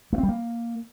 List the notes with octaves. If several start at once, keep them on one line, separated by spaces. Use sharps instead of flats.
A3
C4
G3
A#3